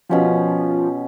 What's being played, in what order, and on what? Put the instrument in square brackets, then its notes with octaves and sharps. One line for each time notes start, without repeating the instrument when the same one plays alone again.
[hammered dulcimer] B2 C#4 G4 [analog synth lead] F3